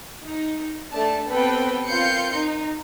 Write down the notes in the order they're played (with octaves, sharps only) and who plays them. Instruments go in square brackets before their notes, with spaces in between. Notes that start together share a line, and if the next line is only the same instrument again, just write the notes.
[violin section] D#4
A3 D4 A5
B3 C4 G4 A4 B4 G5
C4 F4 A#4 C6 G6 C#7
D#4